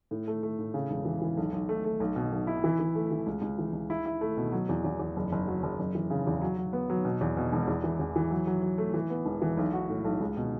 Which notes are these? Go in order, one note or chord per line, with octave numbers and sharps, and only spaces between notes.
A2
A3
A3
A2
C#3
E1
E3
E3
B1
B1
A3
A3
B1
B2
B1
E4
E3
E3
A3
E3
C#2
C#2
E3
C#2
E4
E4
A3
B2
F#3
E2
E2
E2
F#1
F#1
F#3
F#1
F#1
E3
C#3
E2
F#3
F#3
B3
F#3
B2
E2
B2
E1
E2
E3
E2
E3
F#3
F#3
F#3
A3
E3
B3
E1
E3
B1
F#4
A2
B1
C#2
B2